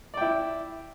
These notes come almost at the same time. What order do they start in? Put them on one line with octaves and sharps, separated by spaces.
D5 G5 E4